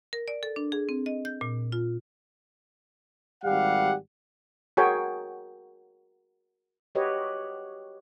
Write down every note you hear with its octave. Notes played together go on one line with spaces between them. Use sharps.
A#4
D5
A4
D4
G#4
C4
D#5
G6
A#2
F4
G#1 G3 G4 F5 F#5
F#4 G#4 A#4 C#5 G5 G#5
F#4 G4 B4 C#5 D#5